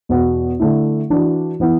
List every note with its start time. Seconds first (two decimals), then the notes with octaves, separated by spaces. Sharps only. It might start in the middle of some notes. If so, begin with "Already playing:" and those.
0.09 E2 B2 B3 F#4
0.60 D3 A3 E4
1.10 E3 D4 F#4
1.60 E3 B3 E4